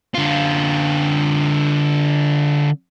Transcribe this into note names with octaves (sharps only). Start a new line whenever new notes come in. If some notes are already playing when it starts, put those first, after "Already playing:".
D3 F4